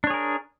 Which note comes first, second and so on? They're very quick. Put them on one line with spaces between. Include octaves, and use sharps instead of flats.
D4 C#5 G#4 A#4